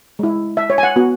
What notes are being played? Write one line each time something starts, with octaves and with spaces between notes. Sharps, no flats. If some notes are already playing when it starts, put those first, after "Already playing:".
G#3 E4
E5
C#5
G#5
F#5
B3 F#4